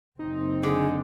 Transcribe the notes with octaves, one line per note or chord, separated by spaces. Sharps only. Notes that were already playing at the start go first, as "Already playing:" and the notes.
F#1 C4 D#4
D3 G#4